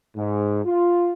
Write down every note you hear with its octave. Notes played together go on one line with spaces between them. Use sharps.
G#2
F4